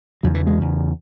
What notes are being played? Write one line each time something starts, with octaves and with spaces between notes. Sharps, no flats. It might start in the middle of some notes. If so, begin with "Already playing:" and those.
E2 C#3 F#3
E3
G#3
E2 C#3